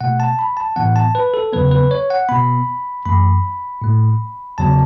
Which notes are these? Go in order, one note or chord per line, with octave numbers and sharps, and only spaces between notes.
B2 A3 F#5
A5
B5
A5
A2 E3 B3 F#5
A5
B4
A4
E2 C#3 F#3 B3 B4
B4
C#5
F#5
B2 B3 B5
F#2 E3 A3 B5
A2 A3
E2 C#3 F#3 B3 A5